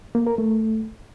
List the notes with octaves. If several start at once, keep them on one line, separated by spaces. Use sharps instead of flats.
A#3
A#4
A3